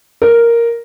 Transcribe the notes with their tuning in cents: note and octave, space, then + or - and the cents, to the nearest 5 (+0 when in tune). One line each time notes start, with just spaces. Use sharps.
A#4 +0